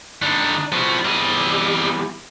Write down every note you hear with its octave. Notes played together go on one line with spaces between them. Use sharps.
D3 G3 D4 D#4
F3 G3 B3 F#4
E2 G3 C4 D#5